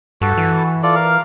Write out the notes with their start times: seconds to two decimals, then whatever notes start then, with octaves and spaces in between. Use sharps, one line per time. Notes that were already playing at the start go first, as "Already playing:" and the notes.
0.21 G2 F#4 A4
0.38 E3
0.83 F4 A4 D5
0.95 A#4 F5